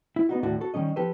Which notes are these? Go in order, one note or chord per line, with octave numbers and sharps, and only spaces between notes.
E4
B3 D#4 F#4
D#2 A2 D3 F#4 A4 E5
F#4 A4
D#3 G3 C#4 D#5
F3 G4 A4 B4